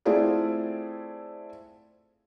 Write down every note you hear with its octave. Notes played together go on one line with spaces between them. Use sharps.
A3 C4 E4 F4 G#4 D5